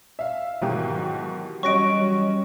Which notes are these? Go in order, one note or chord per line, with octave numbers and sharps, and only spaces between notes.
E5 F5
G#2 B2 D#3 E3 F#3 G4
G3 C#4 F#4 D#5 C#6 A#6 D7